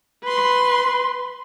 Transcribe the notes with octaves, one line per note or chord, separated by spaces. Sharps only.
B4 C6